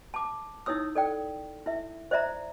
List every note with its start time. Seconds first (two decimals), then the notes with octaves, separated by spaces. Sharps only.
0.14 A5 D6
0.66 D#4 E4 C#5 D#6 E6
0.95 A4 D5 G5
1.66 E4 E5
2.11 C5 D5 E5 A#5